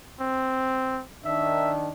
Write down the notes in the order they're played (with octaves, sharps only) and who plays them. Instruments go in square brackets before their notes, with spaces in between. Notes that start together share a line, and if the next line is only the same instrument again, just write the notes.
[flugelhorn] C4
[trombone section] D#3 D4 [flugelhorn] E5